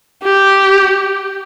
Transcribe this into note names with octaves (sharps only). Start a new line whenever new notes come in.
G4